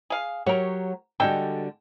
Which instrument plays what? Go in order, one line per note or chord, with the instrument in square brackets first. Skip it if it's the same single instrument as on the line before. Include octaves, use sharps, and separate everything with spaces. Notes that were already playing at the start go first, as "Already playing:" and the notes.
[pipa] G#4 F5
[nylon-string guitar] F#3 G4 C#5 [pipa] F#4 A#4
[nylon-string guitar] D3 G3 F#4 [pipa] G#3 A4 G5